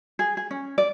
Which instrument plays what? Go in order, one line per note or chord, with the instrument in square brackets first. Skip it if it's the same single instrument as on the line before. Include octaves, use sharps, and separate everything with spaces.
[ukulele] G#4
G#4
C#4
D5